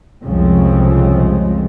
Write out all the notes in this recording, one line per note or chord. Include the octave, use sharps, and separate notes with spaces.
C2 F2 C#3 F3 G#3 C4